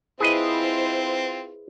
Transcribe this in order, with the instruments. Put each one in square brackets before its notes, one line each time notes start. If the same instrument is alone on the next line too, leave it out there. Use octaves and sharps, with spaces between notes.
[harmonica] C4 F4 [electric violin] E4 C5 [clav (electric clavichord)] G#4 B4 D#5